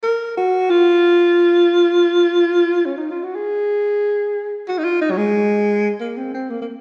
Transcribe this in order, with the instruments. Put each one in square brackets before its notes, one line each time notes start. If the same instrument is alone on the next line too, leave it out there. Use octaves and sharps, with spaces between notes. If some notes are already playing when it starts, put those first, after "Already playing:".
[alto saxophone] A#4
F#4
F4
C#4
D#4
F4
F#4
G#4
F#4
D#4
F4
D#4
F#3
G#3
A#3
C4
C4
A#3
A#3